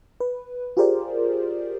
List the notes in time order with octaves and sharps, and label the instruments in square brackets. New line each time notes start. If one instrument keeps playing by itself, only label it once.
[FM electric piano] B4
F4 G4 G#4 A#4 C5 D5